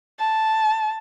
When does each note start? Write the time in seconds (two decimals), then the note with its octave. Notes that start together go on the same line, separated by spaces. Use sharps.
0.19 A5